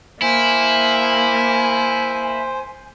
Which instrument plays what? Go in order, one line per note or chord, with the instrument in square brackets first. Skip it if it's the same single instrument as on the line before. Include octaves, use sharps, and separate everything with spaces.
[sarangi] A#3 [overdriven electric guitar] E4 [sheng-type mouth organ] C5 [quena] G#5